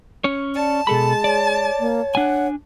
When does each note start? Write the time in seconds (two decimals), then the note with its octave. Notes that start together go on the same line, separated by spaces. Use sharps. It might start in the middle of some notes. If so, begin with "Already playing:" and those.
0.24 C#4 C#5
0.55 D5 A5
0.87 B2 G#3 A4 B5
1.24 C#5 D5
1.80 A#3
2.15 D4 F#5 G#5